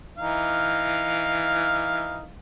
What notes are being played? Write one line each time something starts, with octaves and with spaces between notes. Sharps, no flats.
E3 D#4 F5